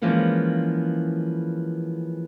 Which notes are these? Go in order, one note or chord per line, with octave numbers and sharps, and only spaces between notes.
E3 F3 G#3 A#3 B3 C#4